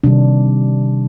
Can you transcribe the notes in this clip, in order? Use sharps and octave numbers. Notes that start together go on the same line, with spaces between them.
C3 D#3 G3 D4